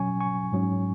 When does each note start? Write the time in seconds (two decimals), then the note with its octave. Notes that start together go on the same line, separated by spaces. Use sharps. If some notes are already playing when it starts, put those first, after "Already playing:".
Already playing: B2 F#3 C#4 G#5 C#6
0.20 G#5 C#6
0.52 G#2 F#3 C#4